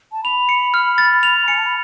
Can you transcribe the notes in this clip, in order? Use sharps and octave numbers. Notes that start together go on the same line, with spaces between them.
A5
B5 F7
C#7
F6
A6
F7
G#5 C#7
A5
B5